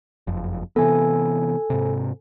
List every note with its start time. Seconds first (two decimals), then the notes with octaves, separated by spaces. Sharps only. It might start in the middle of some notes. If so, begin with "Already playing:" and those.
0.27 F#1 F2
0.76 C3 E3 B3 A4 G#5
1.70 G#2 C3